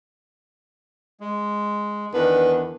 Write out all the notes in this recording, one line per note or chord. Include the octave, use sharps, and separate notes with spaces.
G#3
E2 D#3 B3 D4 B4